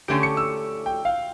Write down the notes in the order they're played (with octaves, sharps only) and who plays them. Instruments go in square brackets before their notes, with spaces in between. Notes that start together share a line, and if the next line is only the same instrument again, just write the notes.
[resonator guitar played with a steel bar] D3 A3 C#4 G4 [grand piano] D7
[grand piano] C#7
E6
G5
F5